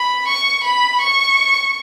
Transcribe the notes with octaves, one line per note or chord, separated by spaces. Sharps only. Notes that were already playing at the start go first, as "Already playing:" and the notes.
Already playing: B5
C#6
B5
C#6